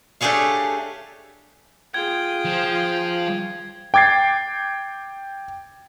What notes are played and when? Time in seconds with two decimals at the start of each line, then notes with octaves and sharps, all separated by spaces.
0.21 A3 D4 G4 G#4 C#5 F5
1.94 F4 G#4 G5 G#6
2.45 F3
3.94 G5 D6 G#6 A6 C7